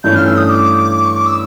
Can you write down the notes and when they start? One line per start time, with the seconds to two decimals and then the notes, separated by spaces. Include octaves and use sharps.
0.04 G2 E3 A3 C#4 G6
0.15 F6
0.27 E6
0.37 D#6
0.49 D6
0.92 D6
1.05 C#6
1.16 D6
1.26 E6